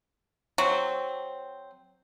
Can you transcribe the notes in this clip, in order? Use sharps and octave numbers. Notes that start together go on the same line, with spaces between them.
F#3 C4